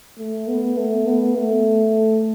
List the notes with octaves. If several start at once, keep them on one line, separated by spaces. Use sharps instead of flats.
A3
B3
A3
B3
A3